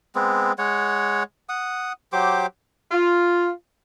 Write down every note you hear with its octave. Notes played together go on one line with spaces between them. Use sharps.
G#3 B3 C4
G#3 C#5 F#5
F#5 D#6
F#3 G4 C5 D6
F4